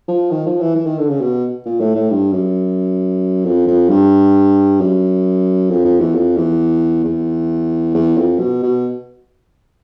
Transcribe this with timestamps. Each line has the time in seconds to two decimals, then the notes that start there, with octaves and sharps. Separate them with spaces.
0.08 F3
0.31 D#3
0.46 F3
0.61 E3
0.75 E3
0.86 D#3
0.98 D3
1.09 C#3
1.21 B2
1.65 A#2
1.80 A2
1.95 A2
2.10 G2
2.33 F#2
3.45 F2
3.67 F2
3.90 G2
4.80 F#2
5.70 F2
5.85 F2
6.00 E2
6.14 F2
6.37 E2
7.05 E2
7.94 E2
8.17 F2
8.39 B2
8.63 B2